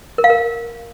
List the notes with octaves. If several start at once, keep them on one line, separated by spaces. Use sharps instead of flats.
A#4
F5
A#4